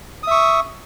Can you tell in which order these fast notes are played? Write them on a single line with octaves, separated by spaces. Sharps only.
D#6 E5 C#6